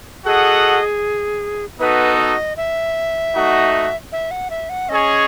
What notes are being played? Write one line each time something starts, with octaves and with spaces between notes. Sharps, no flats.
F#4 G#4 A4 D#5 F#5
B3 D#4 F#4 A4 B4
D#5
E5
A3 D#4 F#4
E5
F#5
E5
F#5
C#4 G#4 C#5 D#5